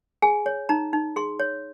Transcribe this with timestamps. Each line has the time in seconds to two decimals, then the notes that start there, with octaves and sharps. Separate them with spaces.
0.22 G#4 G#5
0.46 C#5
0.69 D#4 A#5
0.93 D#4
1.16 G#4 C6
1.40 C#5